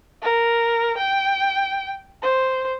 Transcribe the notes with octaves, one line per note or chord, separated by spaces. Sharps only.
A#4
G5
C5